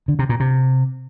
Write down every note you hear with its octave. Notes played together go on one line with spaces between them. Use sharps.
D3
C3
A#2
C3